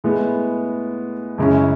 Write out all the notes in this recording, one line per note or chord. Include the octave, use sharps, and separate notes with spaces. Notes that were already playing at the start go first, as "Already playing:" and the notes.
A2 G#3 B3
F#2 C#3 G#3 C#4 E4